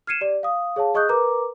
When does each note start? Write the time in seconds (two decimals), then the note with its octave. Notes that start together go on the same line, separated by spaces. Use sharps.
0.07 F6 G#6 C7 C#7 D#7 E7
0.21 G4 D5
0.43 F5 D#6
0.76 G#4 C#5 F5 A5
0.94 G#4 D#5 C#6 D#6 F#6 G6
1.09 A#4 B4 A#5 D6